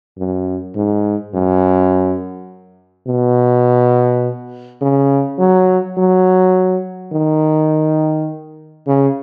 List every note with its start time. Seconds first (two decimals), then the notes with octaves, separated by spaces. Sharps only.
0.18 F#2
0.75 G#2
1.34 F#2
3.07 B2
4.82 C#3
5.38 F#3
5.97 F#3
7.12 D#3
8.87 C#3